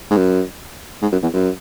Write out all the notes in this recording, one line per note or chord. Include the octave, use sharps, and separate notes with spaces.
G#2
F#2
G#2
F#2
E2
F#2